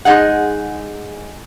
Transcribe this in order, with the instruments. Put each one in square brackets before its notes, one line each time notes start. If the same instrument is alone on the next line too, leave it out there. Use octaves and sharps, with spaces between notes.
[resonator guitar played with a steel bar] G#3 D#4 G#4 F#5